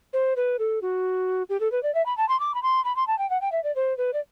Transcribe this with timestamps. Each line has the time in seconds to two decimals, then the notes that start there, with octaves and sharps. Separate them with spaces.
0.13 C5
0.36 B4
0.59 A4
0.82 F#4
1.50 G4
1.60 A4
1.72 B4
1.83 D5
1.95 E5
2.06 B5
2.17 A5
2.29 C6
2.40 D6
2.54 B5
2.63 C6
2.85 B5
2.96 C6
3.07 A5
3.18 G5
3.30 F#5
3.41 G5
3.52 E5
3.64 D5
3.76 C5
3.98 B4
4.13 D5